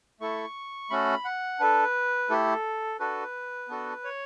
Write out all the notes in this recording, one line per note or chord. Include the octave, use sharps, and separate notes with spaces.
A3 E4 A4 C#6
A3 C#4 F#4 A4 B5
F#5
D4 A4 B4
A3 E4 G4 A4
D4 F#4 A4 B4
B3 D4 F#4 A4
C#5